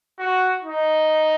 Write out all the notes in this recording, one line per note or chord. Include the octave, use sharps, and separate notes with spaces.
F#4
D#4